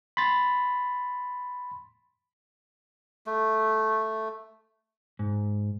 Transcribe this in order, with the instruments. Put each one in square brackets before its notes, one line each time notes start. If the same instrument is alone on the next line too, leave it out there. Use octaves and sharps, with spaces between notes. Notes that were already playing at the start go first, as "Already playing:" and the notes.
[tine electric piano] B5 C6 A6
[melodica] A3
[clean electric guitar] G#2